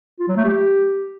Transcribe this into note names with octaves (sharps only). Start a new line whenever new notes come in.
F4
F#3
A3
G4